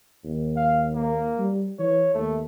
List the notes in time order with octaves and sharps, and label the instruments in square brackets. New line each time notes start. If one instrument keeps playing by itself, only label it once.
[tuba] D#2
[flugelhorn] F5
A#3
[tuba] G3
[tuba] E3 [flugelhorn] C#5
[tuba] D#2 [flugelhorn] A3